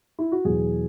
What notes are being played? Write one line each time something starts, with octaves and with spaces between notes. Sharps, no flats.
E4
F#4
E2 B2 F#3 G#4